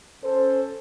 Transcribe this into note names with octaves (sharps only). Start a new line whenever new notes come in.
C#4 A4 C5